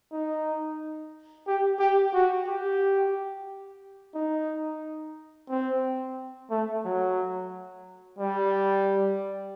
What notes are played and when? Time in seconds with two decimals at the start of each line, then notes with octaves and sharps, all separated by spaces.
0.12 D#4
1.47 G4
1.79 G4
2.14 F#4
2.48 G4
4.15 D#4
5.49 C4
6.51 A3
6.85 F#3
8.19 G3